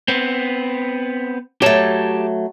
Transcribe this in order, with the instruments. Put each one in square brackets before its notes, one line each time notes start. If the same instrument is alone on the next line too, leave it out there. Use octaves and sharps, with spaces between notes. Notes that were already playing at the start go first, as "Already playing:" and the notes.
[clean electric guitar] B3 C4
[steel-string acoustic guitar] F#3 A3 [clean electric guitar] G4 A5